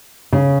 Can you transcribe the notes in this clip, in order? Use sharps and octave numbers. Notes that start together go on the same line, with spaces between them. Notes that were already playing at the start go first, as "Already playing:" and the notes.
C#3